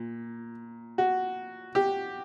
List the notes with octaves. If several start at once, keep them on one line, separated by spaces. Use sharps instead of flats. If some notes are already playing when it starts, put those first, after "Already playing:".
Already playing: A#2
F#4
G4